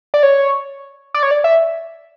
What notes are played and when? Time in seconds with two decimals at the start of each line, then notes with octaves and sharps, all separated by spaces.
0.14 D5
0.23 C#5
1.14 D5
1.23 C#5
1.31 D5
1.44 E5